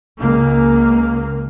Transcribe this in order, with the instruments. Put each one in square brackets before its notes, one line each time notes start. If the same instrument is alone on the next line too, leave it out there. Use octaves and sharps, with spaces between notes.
[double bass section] C#2 A#3